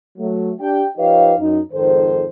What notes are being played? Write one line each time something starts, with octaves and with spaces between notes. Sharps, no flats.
F#3 A3
D4 G4 G5
F3 D#4 G4 B4 C#5 F5
F#2 D#4
F2 G#2 D#3 A4 C5